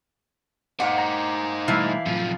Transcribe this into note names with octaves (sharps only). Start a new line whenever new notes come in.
A#3 D#4 G4 C5 F#5
A#5
B2 E3 G3 A3 E4 F5 A5 B5
A1 A2 C3 F3 F#3